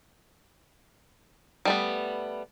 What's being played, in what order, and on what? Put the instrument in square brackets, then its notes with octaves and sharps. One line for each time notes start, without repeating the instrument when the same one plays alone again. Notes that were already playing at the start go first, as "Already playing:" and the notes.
[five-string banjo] G3 A3 B3